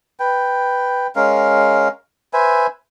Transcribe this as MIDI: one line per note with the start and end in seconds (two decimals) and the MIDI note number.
0.20 1.07 71
0.20 1.07 79
1.16 1.88 56
1.16 1.88 61
1.16 1.88 70
1.16 1.88 77
2.33 2.67 71
2.33 2.67 72
2.33 2.67 76
2.33 2.67 80